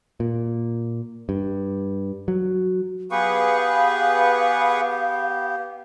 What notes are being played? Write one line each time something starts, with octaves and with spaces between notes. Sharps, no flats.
A#2
G2
F#3
B3 G4 G#4 B4 F5 C#6